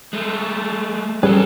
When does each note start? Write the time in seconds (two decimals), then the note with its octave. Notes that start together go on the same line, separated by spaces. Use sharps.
0.13 G#3 A3
1.23 G3 C#4 G#4 A4 B4